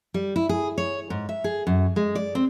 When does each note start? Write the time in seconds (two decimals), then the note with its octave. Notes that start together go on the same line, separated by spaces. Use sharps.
0.14 G3
0.36 E4
0.49 G#4
0.78 C#5
1.10 G#2
1.29 E5
1.44 G#4
1.67 F#2
1.96 G#3
2.15 D5
2.35 C4